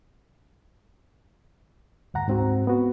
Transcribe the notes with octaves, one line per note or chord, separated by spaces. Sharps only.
D2 G2 F#5 A#5
G#2 C4 F#4
B3 F#4